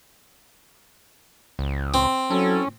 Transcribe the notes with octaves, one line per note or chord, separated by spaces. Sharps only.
C#2
C4
F#3 C#4 E4 A4